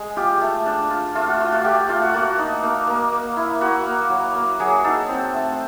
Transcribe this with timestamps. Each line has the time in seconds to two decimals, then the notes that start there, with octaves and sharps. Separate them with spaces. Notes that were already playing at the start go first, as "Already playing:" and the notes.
Already playing: G#3
0.17 F4 G4
0.41 A3
0.66 D4
0.90 F4
1.15 A3 F4
1.27 F#4
1.40 A3 F4
1.52 F#4
1.64 A3 G4
1.89 A3 F4
2.02 F#4
2.14 A#3 F#4
2.39 D#4
2.63 A#3
2.87 A#3
3.12 A#3
3.37 E4
3.61 A#3 F#4
3.86 A#3
4.10 F#3
4.35 A#3
4.60 F#3 G#4
4.84 D#4 A4
5.09 C4
5.34 A3
5.52 C5